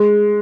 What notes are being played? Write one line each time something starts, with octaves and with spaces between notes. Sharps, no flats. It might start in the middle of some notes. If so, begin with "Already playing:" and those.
Already playing: G#3